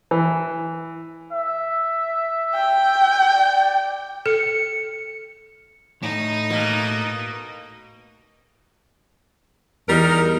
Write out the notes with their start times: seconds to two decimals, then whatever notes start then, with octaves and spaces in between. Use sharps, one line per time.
0.11 E3
1.33 E5
2.55 G5
3.32 D5
4.26 A4 C#7
6.02 A2 D#4 D#5
6.50 B2 A#3
9.88 E2 G3 D#4 A#4